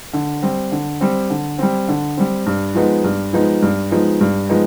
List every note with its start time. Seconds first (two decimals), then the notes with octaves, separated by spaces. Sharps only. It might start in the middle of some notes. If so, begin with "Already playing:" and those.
0.13 D3
0.42 G3 C4
0.72 D3
1.01 G3 C4
1.30 D3
1.59 G3 C4
1.88 D3
2.17 G3 C4
2.46 G2
2.75 F3 G#3 B3 D#4
3.04 G2
3.33 F3 G#3 B3 D#4
3.62 G2
3.91 F3 G#3 B3 D#4
4.21 G2
4.49 F3 G#3 B3 D#4